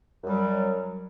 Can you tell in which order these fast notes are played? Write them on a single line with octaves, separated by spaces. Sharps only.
F#2 G3 F#3